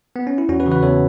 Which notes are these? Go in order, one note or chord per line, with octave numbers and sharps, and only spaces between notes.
B3
C#4
E4
E2 C#4 F#4
F#4 B4
C#3 E3
F#4 B4
E2 A4 C#5